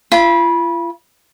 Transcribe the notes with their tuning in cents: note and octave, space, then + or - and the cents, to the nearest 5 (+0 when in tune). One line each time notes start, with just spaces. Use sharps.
F4 -40 B5 -25